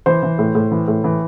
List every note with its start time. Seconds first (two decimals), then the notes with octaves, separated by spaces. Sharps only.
0.06 E3 C5
0.23 E3
0.39 A2
0.55 A2
0.71 E3
0.88 A2
1.04 E3